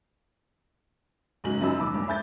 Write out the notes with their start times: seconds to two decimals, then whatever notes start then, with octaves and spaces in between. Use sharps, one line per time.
1.44 F#1 G#2 F#3 F#7
1.61 F#2 F3 F#3 D#4 B5 E6
1.78 D#2 B2 B5 D6
1.94 G2 A#2
2.08 E5 B5 G6 A6